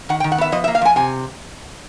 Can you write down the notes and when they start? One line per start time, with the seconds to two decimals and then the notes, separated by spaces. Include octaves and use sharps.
0.09 D#3 F#5
0.20 G5
0.24 D#3
0.32 F#5
0.38 B3 E5
0.52 F3 D#5
0.64 E5
0.68 A#3
0.75 F5
0.81 F3 G#5
0.96 C3 G#5